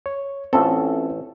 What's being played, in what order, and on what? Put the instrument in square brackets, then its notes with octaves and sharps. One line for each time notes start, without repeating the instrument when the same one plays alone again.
[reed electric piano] C#5
[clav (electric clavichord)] A1 A4 [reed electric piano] C4 C#4 F4